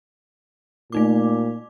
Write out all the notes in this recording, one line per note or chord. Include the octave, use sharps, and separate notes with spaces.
A#2 A3 D#4 D6